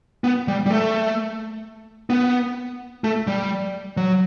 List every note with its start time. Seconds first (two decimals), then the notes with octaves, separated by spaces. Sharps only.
0.24 B3
0.48 G3
0.66 G3
0.71 A3
2.10 B3
3.04 A3
3.27 G3
3.97 F#3